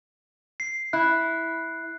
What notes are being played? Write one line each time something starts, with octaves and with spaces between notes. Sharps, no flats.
C7
E4 F#6